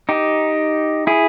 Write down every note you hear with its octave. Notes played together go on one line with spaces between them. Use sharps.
D#4 G4
E4 G#4